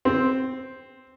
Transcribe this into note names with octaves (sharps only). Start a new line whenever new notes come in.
C4